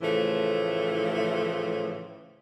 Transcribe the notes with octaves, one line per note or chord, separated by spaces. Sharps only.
A2 C#3 E3 F3 A3